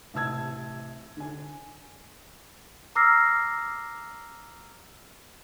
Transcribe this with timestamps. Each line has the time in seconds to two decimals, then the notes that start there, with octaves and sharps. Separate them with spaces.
0.14 A1 C3 A5 E6 G#6
1.17 D3 D4 G#5
2.95 A#5 D6 E6 F6 A#6 C7